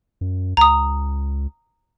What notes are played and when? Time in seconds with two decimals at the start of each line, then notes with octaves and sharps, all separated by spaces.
0.21 F#2
0.57 C#2 A#5 D#6